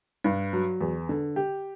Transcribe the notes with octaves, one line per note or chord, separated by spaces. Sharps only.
G2
F#3
E2
D3
G4